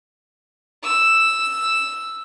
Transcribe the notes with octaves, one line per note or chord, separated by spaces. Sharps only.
E6